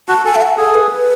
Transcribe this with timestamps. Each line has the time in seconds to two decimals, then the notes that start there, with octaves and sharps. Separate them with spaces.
0.09 F#4 A5
0.25 A4 G#5
0.35 E5
0.41 F#5
0.57 G#4 A4
0.74 B4